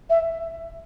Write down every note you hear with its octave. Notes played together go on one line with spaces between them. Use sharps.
E5